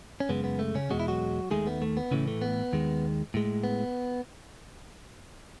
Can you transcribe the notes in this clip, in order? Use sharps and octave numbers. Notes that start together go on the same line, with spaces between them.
C#4
F#2 C#3 G#3 B3
B3
A3
C#3 C#4
E2 B2 G#3 F#4
E4
F#3 F#4
D#2 D#3 G#3 A3 G#4
B3
A3
B3
A2 C#3 E3 A3 C#4
A3
B3
D#2 D#3 G#3
A2 G#3
B3